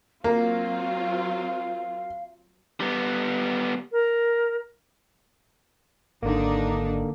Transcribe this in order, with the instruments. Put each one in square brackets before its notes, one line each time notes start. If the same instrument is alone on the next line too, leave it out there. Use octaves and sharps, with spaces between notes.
[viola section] F#3 C4 F4 [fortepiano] A#3 [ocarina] F5
[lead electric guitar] G3 B3
[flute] A#4
[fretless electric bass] G#1 [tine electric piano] D3 A#3 [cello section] D4 D#4